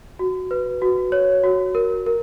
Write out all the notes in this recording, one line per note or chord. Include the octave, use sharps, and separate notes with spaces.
F#4
B4
F#4
C#5
F#4
A#4
A#4